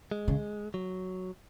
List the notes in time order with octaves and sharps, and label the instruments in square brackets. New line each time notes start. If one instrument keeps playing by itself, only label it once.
[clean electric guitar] G#3
[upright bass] C#3
[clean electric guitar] F#3